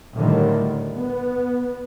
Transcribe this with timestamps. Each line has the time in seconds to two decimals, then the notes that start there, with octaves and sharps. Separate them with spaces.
0.15 A2 D3 D#3 F#3 G3
0.93 B3